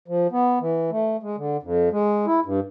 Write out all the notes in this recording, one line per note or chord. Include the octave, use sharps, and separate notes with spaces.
F3
B3
E3
A3
G#3
D3
F2
G#3
E4
G2